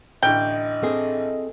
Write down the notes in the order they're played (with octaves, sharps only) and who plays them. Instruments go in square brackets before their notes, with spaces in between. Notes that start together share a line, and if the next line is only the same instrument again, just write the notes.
[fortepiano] A1 D3 [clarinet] D#5 [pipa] G5
[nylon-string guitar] A3 C4 G#4